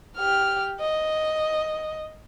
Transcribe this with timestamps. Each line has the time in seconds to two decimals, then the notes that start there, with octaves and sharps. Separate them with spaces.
0.17 G4 F6
0.80 D#5